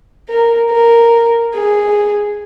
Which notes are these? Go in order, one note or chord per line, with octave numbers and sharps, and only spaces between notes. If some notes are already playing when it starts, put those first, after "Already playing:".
A#4
A#4
G#4